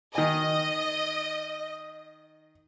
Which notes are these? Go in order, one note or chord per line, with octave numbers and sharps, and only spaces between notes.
D#3 D#5 G#5